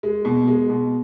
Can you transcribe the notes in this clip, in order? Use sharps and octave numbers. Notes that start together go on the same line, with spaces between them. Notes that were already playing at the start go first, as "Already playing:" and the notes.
G#3
B2
G#3
B2